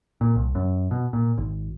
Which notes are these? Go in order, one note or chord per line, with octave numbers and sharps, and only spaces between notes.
A#2
C2
F#2
B2
A#2
G#1